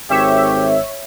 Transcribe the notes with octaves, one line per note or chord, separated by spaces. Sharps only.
G#1 G4 C#5 E5